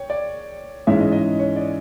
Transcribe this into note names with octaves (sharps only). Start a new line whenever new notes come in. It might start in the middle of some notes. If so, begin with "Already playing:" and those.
Already playing: C#5 G5
D5
G#2 E3 G#3 C#4 E5
D#5
D#5
C#5
D5